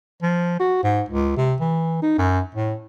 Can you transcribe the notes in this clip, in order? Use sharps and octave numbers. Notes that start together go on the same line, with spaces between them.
F3
F#4
G#2
C#2
C3
E3
D#4
F#2
A2